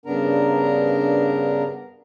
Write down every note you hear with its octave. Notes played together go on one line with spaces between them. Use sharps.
G2 C#3 B3 D4 A#4 A#5